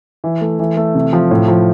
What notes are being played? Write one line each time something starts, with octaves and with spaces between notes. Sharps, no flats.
E3
A3
E3
A3
C3
F3
A2
F3